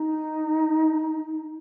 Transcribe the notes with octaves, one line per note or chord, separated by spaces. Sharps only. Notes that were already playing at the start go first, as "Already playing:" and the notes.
Already playing: D#4